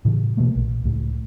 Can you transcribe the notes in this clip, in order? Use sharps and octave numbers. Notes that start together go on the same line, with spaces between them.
A2 C#3 E3
B2 E3 A3 A#3
A#1
C#2 A2